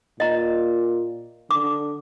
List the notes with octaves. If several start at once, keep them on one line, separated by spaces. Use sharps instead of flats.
A#2 D#5 A#5
D3 D6